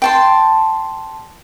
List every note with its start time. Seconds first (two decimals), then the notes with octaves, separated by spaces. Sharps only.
0.02 G5 A5 C6